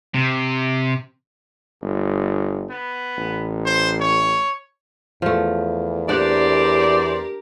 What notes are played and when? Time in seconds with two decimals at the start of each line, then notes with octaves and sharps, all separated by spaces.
0.14 C3
1.82 G1
2.70 B3
3.17 A1
3.65 C5
4.00 C#5
5.22 E2 F3 A3
6.09 D4 G4 A#4 C5 D5 F#5